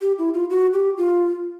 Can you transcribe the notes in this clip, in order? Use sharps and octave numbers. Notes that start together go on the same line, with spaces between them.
G4
E4
F4
F#4
G4
F4